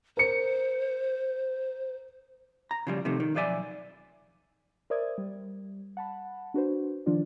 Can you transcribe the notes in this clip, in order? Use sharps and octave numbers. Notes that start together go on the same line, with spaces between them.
A#4 C5 C#7
A#5
C#3 F3 G3
C3 D#3 F3 A3
D#3
B1 F3 B4 D5 E5 G#5
A#4 C5 D5 E5 D#6 G#6
G3
F#5 A5 B5
D4 F#4 B4 C5
D#3 F3 D4 F4 D5